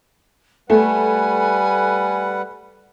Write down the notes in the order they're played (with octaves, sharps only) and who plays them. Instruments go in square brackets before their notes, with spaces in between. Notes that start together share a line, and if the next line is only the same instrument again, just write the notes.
[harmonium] G3 B4 F#5 [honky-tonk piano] A3 [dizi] G#5